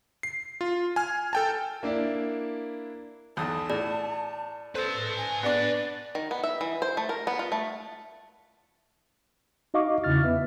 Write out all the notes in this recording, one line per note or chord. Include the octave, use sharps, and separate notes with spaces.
C7
F4
G#5 F6
A4 G5 A5
A#3 D4 E4 D5
B1 E2 A5 D#6
A2 D5
A4 B4 C5 A5
G#5
B3 D4 D5
D#3
B3
E5
E3
C5
A3
A#4
B3
F4
A3
D#4 F#4 D#5 F5 C#6 D6
E2 C#3 E4 F6 A6
B3 B4 E5